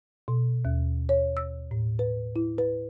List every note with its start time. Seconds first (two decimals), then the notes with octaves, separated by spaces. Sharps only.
0.28 B2
0.65 D#2
1.09 C#5
1.37 E6
1.71 A2
1.99 B4
2.36 E4
2.58 B4